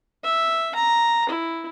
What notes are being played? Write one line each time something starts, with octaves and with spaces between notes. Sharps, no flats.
E5
A#5
E4